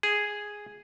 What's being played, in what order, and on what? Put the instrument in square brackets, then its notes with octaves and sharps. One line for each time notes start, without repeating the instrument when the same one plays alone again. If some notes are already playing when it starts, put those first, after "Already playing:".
[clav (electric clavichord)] G#4